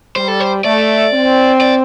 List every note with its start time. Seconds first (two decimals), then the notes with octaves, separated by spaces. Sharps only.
0.16 G3 C5
0.28 A4
0.40 C5
0.64 A3 D5
1.13 C4
1.61 D5